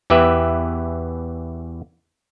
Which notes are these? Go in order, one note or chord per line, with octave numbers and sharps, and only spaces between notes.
E2 E3 G4 B4 E5